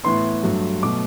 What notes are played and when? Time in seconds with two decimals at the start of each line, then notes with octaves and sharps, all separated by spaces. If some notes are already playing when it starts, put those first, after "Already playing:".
0.03 A2 E3 B3 C6
0.43 G2 F#3 A3
0.82 B2 F#3 A3 D6